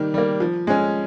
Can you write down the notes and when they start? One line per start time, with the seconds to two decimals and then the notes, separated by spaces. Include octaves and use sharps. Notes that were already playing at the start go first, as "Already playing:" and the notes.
Already playing: D#3 G3 A#3
0.14 G3 A#3
0.40 F3
0.67 G#3 C#4